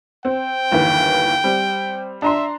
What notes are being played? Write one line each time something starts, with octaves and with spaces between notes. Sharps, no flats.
C4 G5
G1 D#2 E3
G3 C4
D4 E5 A#5 C6